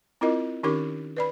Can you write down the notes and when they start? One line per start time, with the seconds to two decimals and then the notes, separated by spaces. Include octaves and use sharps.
0.21 C4 E4 F4 A#4 D#5
0.63 D#3 C#4 D#4 G4 A#4 D6
1.17 B4 D5 B5